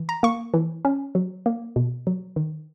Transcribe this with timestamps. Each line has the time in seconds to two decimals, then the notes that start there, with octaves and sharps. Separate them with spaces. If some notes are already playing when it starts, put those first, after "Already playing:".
Already playing: E3
0.09 A#5
0.23 A#3 C#6
0.54 E3
0.85 C#4
1.15 F#3
1.46 A#3
1.76 B2
2.07 F#3
2.36 D#3